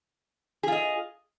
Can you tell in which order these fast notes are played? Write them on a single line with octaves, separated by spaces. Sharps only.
G#4 F4 D#5